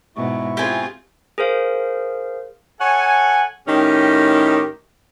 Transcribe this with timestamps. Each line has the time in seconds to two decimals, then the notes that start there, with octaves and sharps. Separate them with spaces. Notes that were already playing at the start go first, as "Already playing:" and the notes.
0.16 G#2 B2 E4 C#6
0.57 C4 F4 G4 G#4 G#5
1.38 G#4 A#4 C5 F5
2.80 A4 C#5 F#5 G#5
3.67 A2 D#3 C#4 D#4 G4